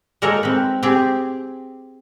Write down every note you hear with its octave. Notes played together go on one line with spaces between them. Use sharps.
G#3 A#3 D#4 A4 A#4 C#5
C4 B4
C4 G4 G#4